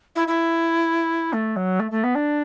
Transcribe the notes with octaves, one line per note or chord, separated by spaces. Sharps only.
E4
E4
A3
F#3
A3
A3
B3
D4